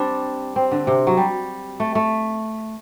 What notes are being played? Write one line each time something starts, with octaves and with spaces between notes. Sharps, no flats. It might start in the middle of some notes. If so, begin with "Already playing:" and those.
Already playing: G3 C4 D4
C4
D3
C3
F#3
G3
A3
A3